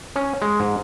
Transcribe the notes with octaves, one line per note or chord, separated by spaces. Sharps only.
C#4
G#3
G#2